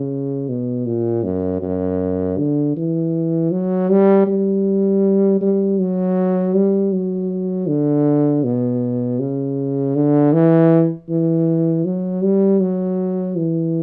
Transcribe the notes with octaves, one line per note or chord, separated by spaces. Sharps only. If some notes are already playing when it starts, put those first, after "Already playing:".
Already playing: C#3
B2
A#2
F#2
F#2
D3
E3
F#3
G3
G3
G3
F#3
G3
F#3
D3
B2
C#3
D3
E3
E3
F#3
G3
F#3
E3